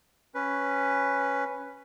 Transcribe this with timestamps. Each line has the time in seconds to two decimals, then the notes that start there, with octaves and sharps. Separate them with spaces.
0.35 C#4 B4